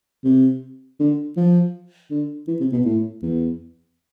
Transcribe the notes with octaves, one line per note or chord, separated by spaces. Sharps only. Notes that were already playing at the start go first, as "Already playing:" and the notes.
C3
D3
F3
D3
E3
C3
B2
A2
E2